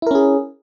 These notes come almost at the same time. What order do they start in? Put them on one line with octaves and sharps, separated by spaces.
E4 A#4 C#4 G#4